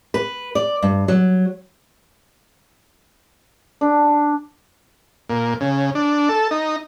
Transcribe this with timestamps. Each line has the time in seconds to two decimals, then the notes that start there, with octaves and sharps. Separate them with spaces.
0.14 B4
0.55 D5
0.82 G2
1.08 F#3
3.81 D4
5.29 A#2
5.61 C#3
5.95 D4
6.29 A4
6.51 D#4